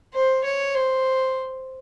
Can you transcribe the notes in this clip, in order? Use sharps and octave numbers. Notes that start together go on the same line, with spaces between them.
C5
C#5
C5